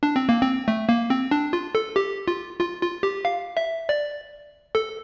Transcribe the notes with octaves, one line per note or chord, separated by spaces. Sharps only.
D4
C4
A#3
C4
A3
A#3
C4
D4
F4
A4
G4
F4
F4
F4
G4
F5
E5
D5
A4